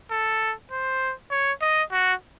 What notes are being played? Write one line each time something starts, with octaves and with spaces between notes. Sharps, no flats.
A4
C5
C#5
D#5
F#4